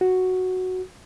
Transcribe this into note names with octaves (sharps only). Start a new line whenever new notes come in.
F#4